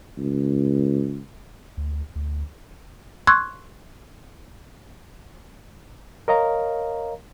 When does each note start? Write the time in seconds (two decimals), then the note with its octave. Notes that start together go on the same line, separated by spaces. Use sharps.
0.18 C#2
1.77 D2
2.16 D2
3.27 C6 C#6 E6 F#6 G#6
6.28 A#4 C#5 D#5 F5 A#5